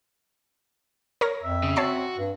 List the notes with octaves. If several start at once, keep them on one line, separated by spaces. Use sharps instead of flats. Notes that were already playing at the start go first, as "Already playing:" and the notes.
A#4 C#5 A#6
F2 E5
C#3
C4 F#4 C#5 A5 C7
G2